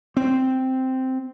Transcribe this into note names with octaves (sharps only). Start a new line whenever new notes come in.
C4